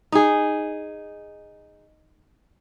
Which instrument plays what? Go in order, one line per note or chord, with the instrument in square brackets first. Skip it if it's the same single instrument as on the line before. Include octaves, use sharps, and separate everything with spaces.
[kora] D#4 G#4